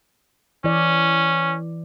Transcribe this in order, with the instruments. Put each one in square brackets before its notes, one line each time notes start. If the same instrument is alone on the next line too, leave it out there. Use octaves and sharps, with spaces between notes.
[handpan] E3 D5 [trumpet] C#4